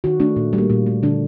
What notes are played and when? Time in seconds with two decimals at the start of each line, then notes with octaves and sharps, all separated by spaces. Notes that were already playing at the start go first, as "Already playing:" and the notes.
0.04 D#3 F#4
0.20 A3 D4
0.36 A#2
0.53 G3
0.58 A#3
0.70 A#2
0.86 A3
1.03 D3 D4